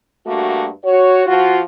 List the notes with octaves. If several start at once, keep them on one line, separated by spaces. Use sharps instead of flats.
G2 A3 A#3 F#4
F#4 C#5
F3 F4 F#4